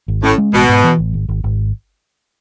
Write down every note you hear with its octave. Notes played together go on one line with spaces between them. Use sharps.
G#1
A2 C#4
G#3
A1 B2
G#2
E3
A1
G#1
G#1
G#1